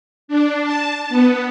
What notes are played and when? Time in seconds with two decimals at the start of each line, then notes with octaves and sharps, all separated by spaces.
0.28 D4
0.64 A5
1.09 B3